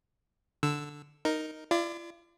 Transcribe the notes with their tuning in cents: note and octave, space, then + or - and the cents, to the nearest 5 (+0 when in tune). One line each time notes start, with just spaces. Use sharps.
D3 +0 E6 +0
D#4 +0 A#4 +0
F4 -45 D5 +15